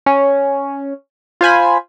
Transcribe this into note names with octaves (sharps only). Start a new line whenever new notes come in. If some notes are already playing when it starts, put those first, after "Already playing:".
C#4
F4 C5 G#5 B5